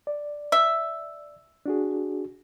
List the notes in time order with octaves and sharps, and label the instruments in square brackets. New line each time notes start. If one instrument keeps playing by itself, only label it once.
[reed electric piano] D5
[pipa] E5
[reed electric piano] D4 F#4 G#4